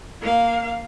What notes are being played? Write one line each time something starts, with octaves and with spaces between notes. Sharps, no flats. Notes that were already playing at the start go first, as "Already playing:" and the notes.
A#3 F5